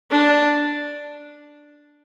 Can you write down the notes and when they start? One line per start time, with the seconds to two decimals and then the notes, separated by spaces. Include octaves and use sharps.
0.11 D4